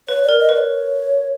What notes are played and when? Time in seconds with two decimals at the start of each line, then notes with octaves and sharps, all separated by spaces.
0.08 B4 C#5
0.23 D5
0.29 A#4
0.39 D#5
0.49 B4
0.54 D5
0.58 C#5